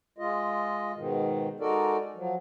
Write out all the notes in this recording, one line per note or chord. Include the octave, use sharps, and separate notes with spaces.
G#3 F4 D#5
G#2 B2 D#3
G#3 D#4 F#4 A4 A#4 D5
F3 F#3